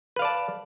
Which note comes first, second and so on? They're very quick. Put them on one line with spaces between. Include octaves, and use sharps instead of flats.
B4 F5 D5 A5